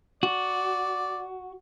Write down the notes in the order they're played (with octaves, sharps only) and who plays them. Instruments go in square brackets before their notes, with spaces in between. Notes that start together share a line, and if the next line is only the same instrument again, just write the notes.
[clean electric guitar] F#4 [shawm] D5